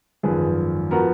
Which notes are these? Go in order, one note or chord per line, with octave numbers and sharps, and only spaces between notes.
G#1 F#2 F3 G#4 B4
F3 B3 F#4 A#4